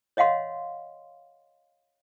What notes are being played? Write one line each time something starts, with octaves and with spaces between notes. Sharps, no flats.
C#5 D#5 F5 F#5 C6